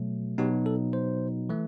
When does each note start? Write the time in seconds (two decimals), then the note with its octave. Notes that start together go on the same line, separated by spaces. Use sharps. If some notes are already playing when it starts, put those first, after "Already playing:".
Already playing: B2 F#3 A3
0.38 B2 F#3 B3 D#4 G4
0.66 A4
0.93 C5
1.49 E3 A3